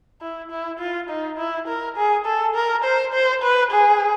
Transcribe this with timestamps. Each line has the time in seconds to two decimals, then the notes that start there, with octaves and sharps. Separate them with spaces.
0.21 E4
0.51 E4
0.79 F4
1.09 D#4
1.38 E4
1.68 A#4
1.97 G#4
2.26 A4
2.55 A#4
2.84 C5
3.13 C5
3.43 B4
3.71 G#4